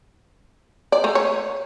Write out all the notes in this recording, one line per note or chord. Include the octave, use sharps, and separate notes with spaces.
D5
A3
C#5